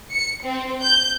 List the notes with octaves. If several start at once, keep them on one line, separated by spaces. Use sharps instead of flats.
C#7
C4
G6